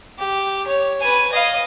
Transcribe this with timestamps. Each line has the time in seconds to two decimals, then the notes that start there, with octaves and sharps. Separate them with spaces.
0.18 G4
0.67 C#5
1.01 B4 G#5
1.32 D#5 F5